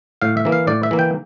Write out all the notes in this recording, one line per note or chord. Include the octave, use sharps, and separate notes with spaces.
A2 F5
E5
E3 A#3
F5
A2 D5
E5
E3 A#3
G5